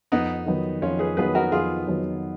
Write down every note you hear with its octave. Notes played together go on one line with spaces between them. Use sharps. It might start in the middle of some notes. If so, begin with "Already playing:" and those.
F2 B3 D#4
D#3 F#3 B3
F2 C#4 F4
G#4 B4
D#3 F#3 B3 G#4 B4
F#4 A#4
F2 F4 G#4
D#3 F#3 B3